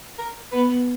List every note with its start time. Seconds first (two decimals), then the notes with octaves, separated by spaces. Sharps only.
0.19 A#4
0.52 B3 B4